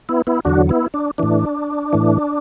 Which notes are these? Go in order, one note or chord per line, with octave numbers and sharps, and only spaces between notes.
B3 E4
B3 E4
E2 D3 F#3 D4 F#4
B3 E4
D4
A2 E3 D4
A2 E3